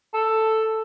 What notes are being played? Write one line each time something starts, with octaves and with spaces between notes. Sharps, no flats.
A4